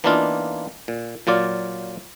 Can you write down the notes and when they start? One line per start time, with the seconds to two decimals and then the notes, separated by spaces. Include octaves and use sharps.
0.04 E3 A#3 B3 D4 D#4 F4
0.88 A#2
1.27 A#2 F#3 F4 D5